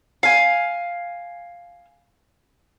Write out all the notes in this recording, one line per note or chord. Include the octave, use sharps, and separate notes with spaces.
F5 G#5